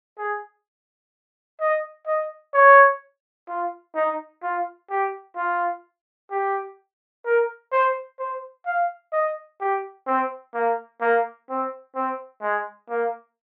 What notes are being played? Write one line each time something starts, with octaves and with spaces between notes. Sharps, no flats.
G#4
D#5
D#5
C#5
F4
D#4
F4
G4
F4
G4
A#4
C5
C5
F5
D#5
G4
C4
A#3
A#3
C4
C4
G#3
A#3